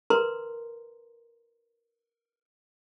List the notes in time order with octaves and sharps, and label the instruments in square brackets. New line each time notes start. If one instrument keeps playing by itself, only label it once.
[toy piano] A#4 B4 A#5 C6